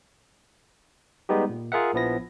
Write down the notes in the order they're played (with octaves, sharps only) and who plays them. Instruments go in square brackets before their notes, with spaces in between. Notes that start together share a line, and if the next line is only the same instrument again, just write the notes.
[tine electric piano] G3 G#3 B3 D#4 G4
A#2
F4 G#4 A#4 E5 F#5
A#1 F3 B3 E4 A#6